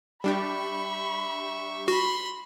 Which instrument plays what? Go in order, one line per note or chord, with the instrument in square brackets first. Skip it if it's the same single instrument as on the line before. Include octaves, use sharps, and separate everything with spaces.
[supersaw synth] G3 D4 G4 [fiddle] E5 C#6 [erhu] B5
[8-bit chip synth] F#4 [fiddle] B5 C6